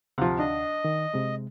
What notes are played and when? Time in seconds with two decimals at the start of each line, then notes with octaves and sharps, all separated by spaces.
0.18 D2 C3 F3 F5 F#5
0.39 D4 D#5
0.85 D#3
1.14 C3 G#3